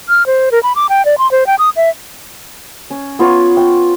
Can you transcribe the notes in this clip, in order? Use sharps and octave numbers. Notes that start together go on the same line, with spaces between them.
F6
C5
A#4
B5
D6
G5
D5
C6
C5
G5
D#6
E5
C#4
B3 F4 C#5
G5